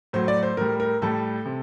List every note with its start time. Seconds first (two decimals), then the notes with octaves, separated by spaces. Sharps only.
0.13 A2 F#3 C5
0.28 D5
0.43 C5
0.57 A2 G3 A#4
0.80 A#4
1.02 A2 G3 A4
1.46 C3